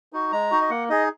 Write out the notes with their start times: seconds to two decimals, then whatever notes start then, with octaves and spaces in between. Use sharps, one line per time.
0.13 D#4 F#4
0.32 G#3 A#5
0.51 D#4 F#4
0.61 D#5
0.70 A#3 F#5
0.89 D#4 G#4 D#5